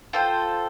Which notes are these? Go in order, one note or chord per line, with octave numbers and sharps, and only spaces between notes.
F4 A4 C5 G5